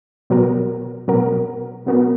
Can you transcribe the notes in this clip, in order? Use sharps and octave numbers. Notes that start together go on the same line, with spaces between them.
B2 F#3 B3 F#4 A#4
B2 F#3 B3 F#4 A#4
B2 F#3 B3 F#4 A#4